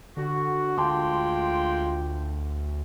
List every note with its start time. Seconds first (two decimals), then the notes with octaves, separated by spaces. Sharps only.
0.17 D3 F#4
0.78 D2 G#3 F4 G5 A5 C6 D6